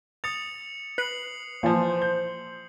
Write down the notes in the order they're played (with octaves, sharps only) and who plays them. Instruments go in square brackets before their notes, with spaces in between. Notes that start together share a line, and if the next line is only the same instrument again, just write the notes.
[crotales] D#6 C#7 F7 [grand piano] A6
[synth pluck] B4 [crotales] C7 F#7
[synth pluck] A#2 [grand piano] E3 F3 [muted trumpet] C5
[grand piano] G6